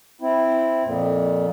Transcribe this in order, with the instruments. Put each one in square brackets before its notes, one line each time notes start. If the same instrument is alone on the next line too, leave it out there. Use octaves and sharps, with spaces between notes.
[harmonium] C4 E4
F2 A#2